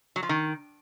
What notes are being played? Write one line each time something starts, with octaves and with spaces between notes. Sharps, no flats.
F#3
F3
D#3